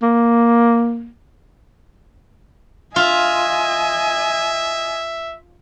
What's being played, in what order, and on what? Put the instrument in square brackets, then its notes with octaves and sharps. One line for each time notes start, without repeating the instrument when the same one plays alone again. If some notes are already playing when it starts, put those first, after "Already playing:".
[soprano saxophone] A#3
[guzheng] F4 [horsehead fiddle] D#5 G#5 [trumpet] E5